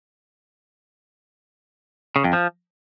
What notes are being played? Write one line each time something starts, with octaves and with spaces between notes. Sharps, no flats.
C#3
F2
F3